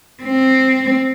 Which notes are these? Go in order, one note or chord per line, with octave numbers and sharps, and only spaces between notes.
C4